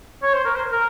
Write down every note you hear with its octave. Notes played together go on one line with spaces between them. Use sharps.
C#5
C5
A#4
C5
A#4